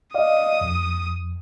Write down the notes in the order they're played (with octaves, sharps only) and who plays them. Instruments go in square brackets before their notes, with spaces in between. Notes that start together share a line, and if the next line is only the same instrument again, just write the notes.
[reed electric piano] D5 D#5 F5 [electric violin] D#6
[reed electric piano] F2